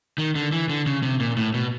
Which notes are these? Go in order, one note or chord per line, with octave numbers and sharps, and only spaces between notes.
D#3
D3
E3
D3
C#3
C3
A#2
A2
B2